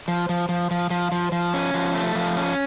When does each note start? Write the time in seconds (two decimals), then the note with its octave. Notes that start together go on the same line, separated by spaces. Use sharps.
0.08 F3
0.29 F3
0.49 F3
0.71 F3
0.90 F3
1.12 F3
1.32 F3
1.54 C#4
1.74 F3
1.94 A3
2.15 F3
2.37 C#4